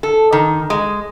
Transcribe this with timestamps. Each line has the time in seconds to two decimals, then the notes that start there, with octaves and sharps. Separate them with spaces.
0.03 A4
0.33 D#3
0.70 G#3